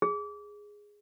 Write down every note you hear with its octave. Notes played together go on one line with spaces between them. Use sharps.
G#4